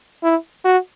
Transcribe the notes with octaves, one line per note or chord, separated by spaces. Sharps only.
E4
F#4